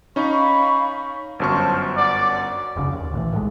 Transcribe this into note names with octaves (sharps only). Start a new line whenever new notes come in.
C#4 D#4 F5 B5 C#6
G1 F#2 C5 A5 C#6 F6
D5 F#5 D6
F1 C#2 A2 C#3
D#2
A#1 A2 E3
B1 A2 G3 G#3